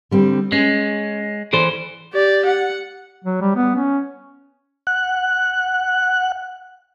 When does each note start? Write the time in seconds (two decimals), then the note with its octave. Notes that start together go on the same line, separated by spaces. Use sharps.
0.11 D3 G3 C4
0.52 G#3 C#4
1.53 E3 A4 C5 D5
2.13 G4 D5
2.46 F#5
3.24 F#3
3.41 G3
3.56 B3
3.75 C#4
4.87 F#5 F#6